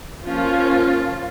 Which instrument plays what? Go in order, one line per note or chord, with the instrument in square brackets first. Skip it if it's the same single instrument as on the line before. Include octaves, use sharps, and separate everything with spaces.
[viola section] F3 A#3 C#4 F4